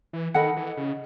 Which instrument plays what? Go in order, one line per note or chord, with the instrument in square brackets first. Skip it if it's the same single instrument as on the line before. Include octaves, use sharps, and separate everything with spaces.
[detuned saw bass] E3
[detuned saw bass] D#3 [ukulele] A4 D#5 F#5 B5
[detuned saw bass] E3
C#3